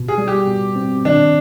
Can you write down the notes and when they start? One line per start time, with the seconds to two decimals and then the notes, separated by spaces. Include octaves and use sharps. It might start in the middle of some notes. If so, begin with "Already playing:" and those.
Already playing: B2
0.08 G#4
0.18 G3
0.28 G4
0.47 B2
0.76 C4
1.05 D#3 D4